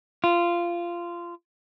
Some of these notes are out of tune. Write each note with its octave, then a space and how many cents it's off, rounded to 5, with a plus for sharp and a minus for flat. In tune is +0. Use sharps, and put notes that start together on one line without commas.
F4 -15